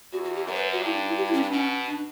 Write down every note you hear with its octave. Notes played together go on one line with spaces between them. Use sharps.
E2 F#4
F#4
G4
F#2 A#4
C#5
B4
F#4
G2 E4
D4
E4
G4
E4
C#4
D4
B2 C#4
D4